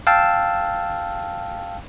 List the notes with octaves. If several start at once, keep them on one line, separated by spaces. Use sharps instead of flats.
F5 G5 A5 E6